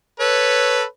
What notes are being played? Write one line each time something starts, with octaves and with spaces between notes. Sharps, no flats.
A4 B4 C#5